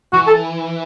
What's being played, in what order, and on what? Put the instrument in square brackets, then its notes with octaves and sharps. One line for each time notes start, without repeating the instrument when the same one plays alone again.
[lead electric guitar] E3 [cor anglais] F#4
[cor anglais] A4